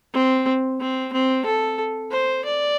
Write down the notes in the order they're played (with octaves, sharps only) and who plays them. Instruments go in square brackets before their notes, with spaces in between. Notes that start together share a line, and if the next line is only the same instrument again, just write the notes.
[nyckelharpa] C4
C4
C4
A4
C5
D5